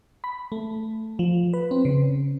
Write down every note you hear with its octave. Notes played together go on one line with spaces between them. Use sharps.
B5
A3
F3
B4
C4
C#3